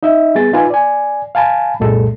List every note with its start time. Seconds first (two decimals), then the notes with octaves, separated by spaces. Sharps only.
0.03 D#4 D#5 E5
0.35 G3 B3 G#4 A6
0.53 D#4 F4 B4 G#5
0.70 D5 G#5
1.35 F5 G#5 A5 B5
1.80 C2 F#2 A#2 G#3 A4